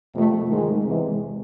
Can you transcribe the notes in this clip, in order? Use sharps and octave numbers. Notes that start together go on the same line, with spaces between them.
F2 C3 F3 A3
G#2 D#3 G#3
E2 C3 E3 G#3